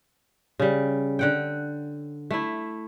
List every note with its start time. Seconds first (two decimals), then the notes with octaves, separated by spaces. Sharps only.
0.60 C#3 G3
1.19 D3 F#5 G5
2.31 A3 E4